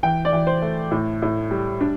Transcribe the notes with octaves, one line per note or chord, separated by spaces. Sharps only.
E3 G5
D5
E3
C5
A3
A2
A2
G3
D4